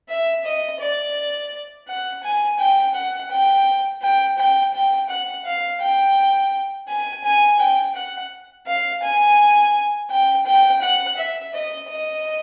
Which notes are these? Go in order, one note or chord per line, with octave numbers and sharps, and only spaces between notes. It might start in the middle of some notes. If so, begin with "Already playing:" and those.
E5
D#5
D5
F#5
G#5
G5
F#5
G5
G5
G5
G5
F#5
F5
G5
G#5
G#5
G5
F#5
F5
G#5
G5
G5
F#5
E5
D#5
D#5